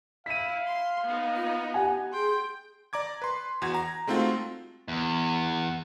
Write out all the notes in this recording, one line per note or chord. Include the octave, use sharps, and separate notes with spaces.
E4 F5 B6 D#7
C6
B3 D#4
F4
G4 F#5 G#5
G#4 G5 C6
D5 A#5 D6 G#6
B4 C6
E2 F#4 G#6
A#5
G#3 A3 C4 D#4 F4 F#4
E2